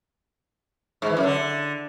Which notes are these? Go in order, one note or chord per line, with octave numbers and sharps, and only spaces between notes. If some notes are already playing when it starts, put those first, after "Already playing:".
G#2
E3
F#2
D3